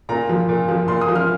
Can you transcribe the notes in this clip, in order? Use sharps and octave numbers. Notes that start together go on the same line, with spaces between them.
A#2 A#5
F3
A#2
F3
A#2 C6
D#6
F3
F6